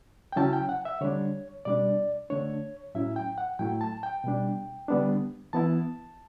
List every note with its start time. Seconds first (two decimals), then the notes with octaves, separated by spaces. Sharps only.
0.32 G5
0.36 C#3 F#3 C#4 E4 A5
0.53 G5
0.69 F#5
0.85 E5
1.01 D3 G3 D4 C#5
1.65 B2 G3 D4 D5
2.30 D3 A3 D4 C#5
2.95 A2 F#3 C#4 E4 E5
3.16 G5
3.38 F#5
3.59 A2 F#3 A3 E4 G5
3.81 A5
4.03 G5
4.24 B2 G3 D4
4.88 D3 G3 B3 D4
5.53 E3 B3 E4 A5